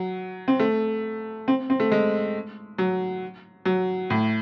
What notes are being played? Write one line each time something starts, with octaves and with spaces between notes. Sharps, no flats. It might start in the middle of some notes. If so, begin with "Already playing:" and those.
Already playing: F#3
C4
A3
C4
C4
A3
G#3
F#3
F#3
A2